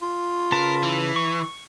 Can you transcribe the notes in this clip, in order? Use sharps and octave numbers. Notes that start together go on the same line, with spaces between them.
F4
C#3 A#4 B4 A5
E3
C#6